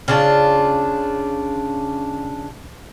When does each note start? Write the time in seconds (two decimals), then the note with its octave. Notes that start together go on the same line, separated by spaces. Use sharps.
0.08 C#3 D4 F4